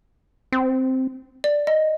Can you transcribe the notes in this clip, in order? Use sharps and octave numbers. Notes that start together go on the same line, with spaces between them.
C4
D5
D#5